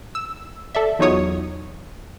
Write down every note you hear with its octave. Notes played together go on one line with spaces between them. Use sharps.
E6
A4 D5 E5
E2 F#3 D#4 F4 C#5 D#6